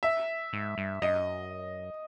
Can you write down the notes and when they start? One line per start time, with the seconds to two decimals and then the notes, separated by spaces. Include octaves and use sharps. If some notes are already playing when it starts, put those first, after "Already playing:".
0.03 E5
0.53 G#2
0.78 G2
1.02 F#2 D#5